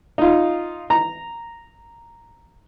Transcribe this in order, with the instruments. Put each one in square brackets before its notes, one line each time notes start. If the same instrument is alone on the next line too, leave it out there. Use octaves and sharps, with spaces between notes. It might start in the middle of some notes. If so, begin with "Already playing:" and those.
[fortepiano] D#4 F4
A#5